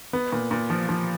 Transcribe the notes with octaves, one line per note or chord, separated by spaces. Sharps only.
B3
A#2
A#2
F3
F3